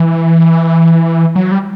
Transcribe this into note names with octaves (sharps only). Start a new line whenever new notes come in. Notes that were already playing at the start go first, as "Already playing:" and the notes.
Already playing: E3
F#3
G3